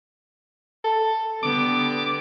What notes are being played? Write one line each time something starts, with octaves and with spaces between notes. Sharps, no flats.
A4
D3 G3 B3 D6